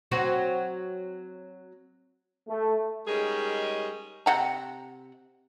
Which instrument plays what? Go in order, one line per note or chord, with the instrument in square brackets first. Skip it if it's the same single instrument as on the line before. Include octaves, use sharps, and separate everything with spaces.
[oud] F#3 C4 F#4
[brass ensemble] A3
[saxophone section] G3 G#3 C#4 D#4 G#4 A#4
[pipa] C3 F#5 A#5